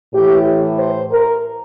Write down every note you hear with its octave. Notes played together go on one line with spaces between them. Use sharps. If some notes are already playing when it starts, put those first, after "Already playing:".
A2 E3 G4
C5
A#4